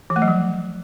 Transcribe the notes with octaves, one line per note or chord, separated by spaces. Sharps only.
E3
A3
F#3
F3